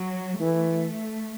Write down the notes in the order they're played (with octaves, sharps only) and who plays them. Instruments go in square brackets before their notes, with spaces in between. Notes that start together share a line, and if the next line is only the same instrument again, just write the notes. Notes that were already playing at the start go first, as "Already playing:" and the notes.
Already playing: [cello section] F#3
[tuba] E3 [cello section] A3